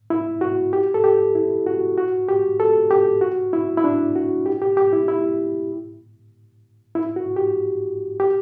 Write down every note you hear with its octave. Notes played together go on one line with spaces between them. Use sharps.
E4
F#4
G4
A4
G4
E4
F#4
F#4
G4
A4
G4
F#4
E4
E4
D4
F#4
G4
G4
G4
E4
E4
E4
F#4
G4
G4